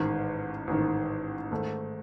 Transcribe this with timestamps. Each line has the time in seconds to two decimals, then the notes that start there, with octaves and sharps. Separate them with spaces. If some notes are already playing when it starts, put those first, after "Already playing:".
Already playing: A1 G#2 D#3
0.67 A1 G#2 D#3
1.51 G#2 D#3 A3